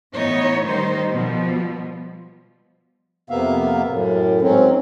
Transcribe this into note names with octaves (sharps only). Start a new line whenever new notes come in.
A2 E3 B3 D#4 C#5
D#3 G3 D#4 C5
B2 F3 G3
F2 C3 A#3 B3 E5 F5
F#2 A2
G#2 F#3 C4 C#4